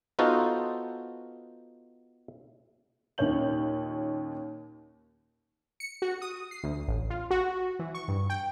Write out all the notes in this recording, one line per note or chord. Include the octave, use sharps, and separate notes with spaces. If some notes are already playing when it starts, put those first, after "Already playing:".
B3 D#4 F4 F#4 A4 C5
D#2 A#2 C#4 C#5 G6 F#7
C#7
F#4
D#6
C7
D2
A1
F4
F#4
E3
C#6
G2
G5